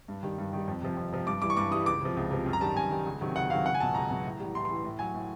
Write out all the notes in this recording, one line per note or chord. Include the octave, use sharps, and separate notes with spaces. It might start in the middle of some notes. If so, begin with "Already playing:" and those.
G2
D#3 G3
G2
D#3 G3
F2
C3 F3
F2
C3 F3
G2 D6
E3 G3 D6
C#6
G2 D6
E3 G3 D#6
C#2 D6
C3 F3
C#2
C3 F3
F#2
A#5
D#3 G3 A5
F#2 G#5
D#3 G3
C#2
C3 D#3 F#3
C#2 F#5
C3 D#3 F#3 F5
C#2 F#5
G#5
B2 F#3 A5
C#2 A#5
B2 F#3
A2
E3 G3
A2 C6
C6
E3 G3
A2
F#3 G#5
A2